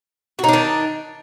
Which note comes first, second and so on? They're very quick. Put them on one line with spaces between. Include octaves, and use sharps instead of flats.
F#4 D#4 D4 D#3